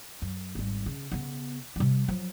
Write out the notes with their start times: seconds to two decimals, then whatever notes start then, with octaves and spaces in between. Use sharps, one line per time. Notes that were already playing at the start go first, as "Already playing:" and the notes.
0.22 F#2
0.55 G#1 G3
0.86 C#3
1.12 C#3 B3
1.76 C3 G3
2.08 F3 F#3